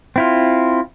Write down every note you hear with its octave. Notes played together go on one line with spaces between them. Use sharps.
C4 E4 F4